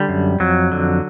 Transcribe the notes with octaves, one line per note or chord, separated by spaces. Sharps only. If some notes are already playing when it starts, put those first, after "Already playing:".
Already playing: D3 G3
F#2
F2 F#3
D3